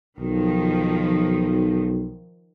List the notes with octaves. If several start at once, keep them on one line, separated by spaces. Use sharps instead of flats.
B1 D#3 F3